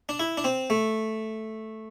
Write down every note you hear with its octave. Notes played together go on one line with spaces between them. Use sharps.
D4
E4
D4
C4
A3